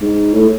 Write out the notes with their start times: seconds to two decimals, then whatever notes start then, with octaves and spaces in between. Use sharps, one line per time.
0.01 G#2
0.34 A2